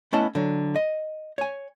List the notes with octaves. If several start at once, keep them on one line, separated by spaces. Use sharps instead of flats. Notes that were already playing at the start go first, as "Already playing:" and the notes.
A3 B3 C#4 E4 D#5 A5
D3 F#3
D#5
C#5 G#5